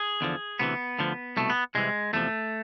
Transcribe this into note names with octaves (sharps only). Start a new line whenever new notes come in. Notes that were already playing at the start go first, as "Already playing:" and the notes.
Already playing: G#4
E2 D3 F3
D2 C3 E3 B3
D2 D3 F3
C2 B2 A3
B3
C2 C3 E3 G#3
E2 C3 F3 A3